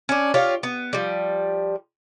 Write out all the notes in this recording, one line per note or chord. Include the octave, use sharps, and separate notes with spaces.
C#4 D4
F4 G4 C#5 F5
B3
F3 G3